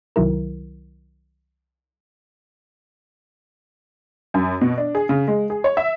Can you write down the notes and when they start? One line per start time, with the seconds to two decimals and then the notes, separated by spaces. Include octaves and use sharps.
0.16 C2 D#3 F#3 E4 A#4
4.34 F#2
4.61 B2
4.78 D4
4.95 G#4
5.09 C#3
5.28 G#3
5.50 G#4
5.64 C#5
5.77 E5